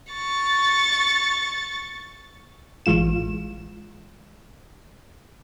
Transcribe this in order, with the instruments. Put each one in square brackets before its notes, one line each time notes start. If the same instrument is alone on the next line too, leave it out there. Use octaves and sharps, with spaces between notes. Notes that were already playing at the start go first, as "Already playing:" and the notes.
[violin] C#6 A6
[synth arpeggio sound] A1 E3 G#3 F4 E7